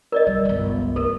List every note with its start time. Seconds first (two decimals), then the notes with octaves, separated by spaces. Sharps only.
0.12 A#4 D5 D#5
0.27 G3
0.45 G1 C#2
0.96 A3 A4 A#4